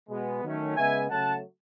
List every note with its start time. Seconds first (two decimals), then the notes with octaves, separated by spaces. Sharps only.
0.09 B2 G#3 B3
0.43 D#3 F#3 A3 C#4
0.76 C#3 G#3 B3 E5 G#5
1.09 C#3 F#3 A3 F#5 A5